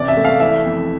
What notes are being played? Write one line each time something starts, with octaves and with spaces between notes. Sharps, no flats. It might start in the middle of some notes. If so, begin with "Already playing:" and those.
Already playing: A1 C3 D5
E5
A3
F5
E3 E5
F2